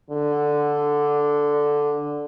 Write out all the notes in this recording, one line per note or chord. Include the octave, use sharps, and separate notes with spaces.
D3